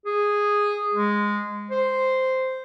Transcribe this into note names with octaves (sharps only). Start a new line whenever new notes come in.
G#4
G#3
C5